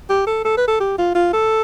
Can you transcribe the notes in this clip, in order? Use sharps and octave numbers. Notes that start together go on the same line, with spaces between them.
G4
A4
A4
B4
A4
G4
F4
F4
A4